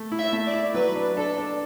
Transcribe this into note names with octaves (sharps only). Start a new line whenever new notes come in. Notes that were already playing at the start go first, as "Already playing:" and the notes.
Already playing: A3
E4
E5
A3
D5
E4
F#3 B4
D4
D4 A4
D4